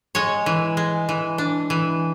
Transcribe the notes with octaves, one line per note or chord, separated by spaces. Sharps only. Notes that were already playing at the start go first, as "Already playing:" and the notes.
G#3 C#5
E3
G#3
E3
D4
E3